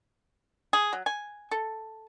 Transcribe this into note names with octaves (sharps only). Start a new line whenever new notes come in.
G#4
F#3
G#5
A4